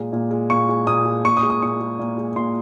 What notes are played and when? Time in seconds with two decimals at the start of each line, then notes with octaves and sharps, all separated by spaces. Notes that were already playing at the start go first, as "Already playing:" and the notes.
Already playing: A#2 G#3
0.13 A#2
0.31 G#3
0.50 A#2 C#6
0.69 G#3
0.87 A#2 D#6
1.05 G#3
1.24 A#2 C#6
1.37 D#6
1.43 G#3
1.50 D#6
1.62 A#2 C#6
1.81 G#3
1.99 A#2
2.18 G#3
2.36 A#2 C6